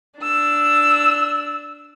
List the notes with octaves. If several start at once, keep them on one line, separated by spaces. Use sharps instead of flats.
D4 E6